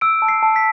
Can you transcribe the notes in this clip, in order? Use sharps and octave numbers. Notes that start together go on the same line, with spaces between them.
E6 D7
A5
C7
A5
B6